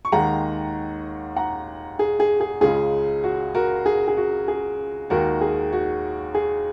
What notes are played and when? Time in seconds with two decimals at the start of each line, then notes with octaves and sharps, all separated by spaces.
0.05 C#6
0.12 D#2 D#3 G#3 F#5 A#5
1.36 F#5 A#5
1.99 G#4
2.20 G#4
2.40 G#4
2.61 C#2 C#3 G#3 G#4
3.24 F#4
3.55 F#4 A#4
3.86 G#4
4.08 G#4
4.17 F#4
4.48 G#4
5.10 D#2 D#3 G#3 F#4 A#4
5.41 G#4
5.73 F#4
6.34 G#4